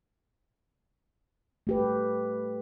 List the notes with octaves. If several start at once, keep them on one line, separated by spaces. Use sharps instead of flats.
A3 G4 B4